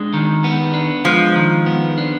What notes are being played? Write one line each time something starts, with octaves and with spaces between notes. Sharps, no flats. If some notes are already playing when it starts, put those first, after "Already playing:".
Already playing: G#3 D4
D#3
B3
D4
F3 G#3
D#3
B3
D4